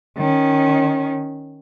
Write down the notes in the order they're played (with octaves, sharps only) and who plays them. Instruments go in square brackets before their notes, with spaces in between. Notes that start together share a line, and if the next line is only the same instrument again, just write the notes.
[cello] D#3 C#4